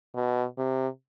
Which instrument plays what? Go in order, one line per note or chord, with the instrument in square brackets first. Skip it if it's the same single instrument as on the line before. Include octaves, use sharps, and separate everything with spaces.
[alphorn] B2
C3